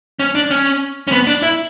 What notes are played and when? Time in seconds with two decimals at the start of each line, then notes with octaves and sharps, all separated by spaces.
0.20 C#4
0.35 D4
0.51 C#4
1.08 C#4
1.12 B3
1.27 D4
1.42 E4